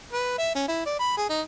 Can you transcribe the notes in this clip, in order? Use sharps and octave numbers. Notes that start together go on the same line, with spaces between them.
B4
E5
C#4
E4
D5
B5
G#4
D#4